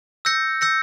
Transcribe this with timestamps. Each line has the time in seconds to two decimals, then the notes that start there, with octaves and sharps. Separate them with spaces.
0.25 E6 G6 A#6 C#7
0.61 E6 G6 A#6 C#7